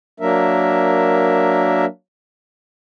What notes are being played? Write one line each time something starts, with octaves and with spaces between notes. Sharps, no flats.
F#3 A#3 D4 A#4 E5